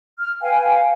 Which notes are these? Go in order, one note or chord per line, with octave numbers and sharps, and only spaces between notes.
F6
B4 F5 G5 G#5